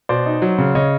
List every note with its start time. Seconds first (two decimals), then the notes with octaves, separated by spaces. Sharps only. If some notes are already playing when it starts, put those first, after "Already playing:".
0.09 B2 C5 D5
0.26 D#4
0.42 F#3
0.58 C#3
0.75 C#3 C#5 D#5